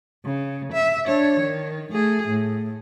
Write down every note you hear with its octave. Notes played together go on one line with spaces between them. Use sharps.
C#3
E5
D4 C#5
D#3
A3 G#4
A2